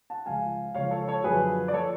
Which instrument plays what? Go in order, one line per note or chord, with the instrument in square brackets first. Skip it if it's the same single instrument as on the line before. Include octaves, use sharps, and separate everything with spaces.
[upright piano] F#5 A5
C#2 C#3 F3 F5 G#5
C#2 C#3 F3 C#5 F5
A4 C#5
A4 C#5
F#2 D3 F3 G#4 B4
D5
F3 A4 C#5